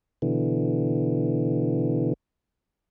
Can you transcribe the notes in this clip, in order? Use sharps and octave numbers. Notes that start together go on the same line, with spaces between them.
B2 D3 E3